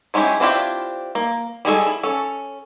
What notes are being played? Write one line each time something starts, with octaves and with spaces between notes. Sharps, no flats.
F#3 G#3 C#4 E4 G4
C4 D4 E4 F4 G4
A#3
G3 G#3 G#4 A4
E4
C#4 A4